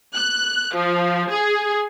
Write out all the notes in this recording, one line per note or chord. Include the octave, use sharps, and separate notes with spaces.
F#6
F3
G#4